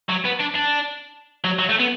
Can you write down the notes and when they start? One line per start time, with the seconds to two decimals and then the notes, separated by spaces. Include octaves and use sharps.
0.09 F#3
0.24 B3
0.40 D4
0.55 D4
1.44 F#3
1.59 F#3
1.69 A3
1.79 B3